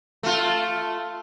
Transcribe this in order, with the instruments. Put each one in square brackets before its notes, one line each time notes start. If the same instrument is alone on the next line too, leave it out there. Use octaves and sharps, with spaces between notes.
[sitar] A3 F4